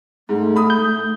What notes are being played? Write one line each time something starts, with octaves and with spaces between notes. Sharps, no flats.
G#2 A3
B5 D#6
G6